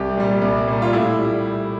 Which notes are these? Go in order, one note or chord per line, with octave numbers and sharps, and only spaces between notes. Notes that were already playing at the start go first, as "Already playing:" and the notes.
Already playing: C2 G4
A#2 G3
C2
A#2 G3
F4
A2 E4
G3